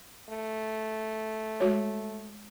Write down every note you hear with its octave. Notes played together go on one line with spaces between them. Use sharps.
A3
G#3 F#4 C#5